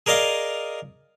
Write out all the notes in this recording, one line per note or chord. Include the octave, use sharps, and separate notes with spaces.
G#4 A#4 D5 D#5 F5